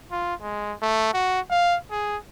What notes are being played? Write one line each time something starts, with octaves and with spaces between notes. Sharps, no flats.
F4
G#3
A3
F#4
F5
G#4